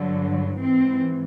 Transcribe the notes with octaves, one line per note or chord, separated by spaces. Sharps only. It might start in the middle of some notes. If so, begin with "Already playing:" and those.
Already playing: G2 D3 F#3
G#2 E3 C4